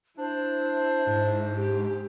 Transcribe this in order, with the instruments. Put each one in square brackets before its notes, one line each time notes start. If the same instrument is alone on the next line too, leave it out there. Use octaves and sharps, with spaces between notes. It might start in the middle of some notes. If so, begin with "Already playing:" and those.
[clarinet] D4 [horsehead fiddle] E4 [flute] C5
[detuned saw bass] G#2
[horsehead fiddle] G4